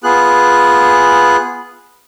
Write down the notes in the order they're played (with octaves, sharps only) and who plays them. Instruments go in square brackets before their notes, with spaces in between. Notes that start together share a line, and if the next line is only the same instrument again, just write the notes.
[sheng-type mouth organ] B3 F4 G#4 F#6